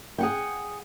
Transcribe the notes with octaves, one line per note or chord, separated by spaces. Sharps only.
G#4 F#5 G5